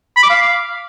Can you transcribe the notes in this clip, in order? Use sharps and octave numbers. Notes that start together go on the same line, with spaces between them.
B5
D6
F5